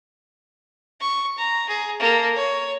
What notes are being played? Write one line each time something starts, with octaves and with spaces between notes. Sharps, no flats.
C#6
A#5
G#4
A#3 A4
C#5